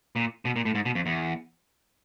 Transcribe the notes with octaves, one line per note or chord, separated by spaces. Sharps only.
A#2
B2
A#2
A2
G#2
B2
F2
E2